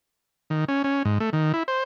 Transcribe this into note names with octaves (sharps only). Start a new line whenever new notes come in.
D#3
C#4
C#4
G#2
A3
D#3
E4
C5